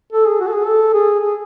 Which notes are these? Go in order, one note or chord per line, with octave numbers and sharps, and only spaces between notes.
A4
G#4
F#4
A4
G#4
A4
G#4
G#4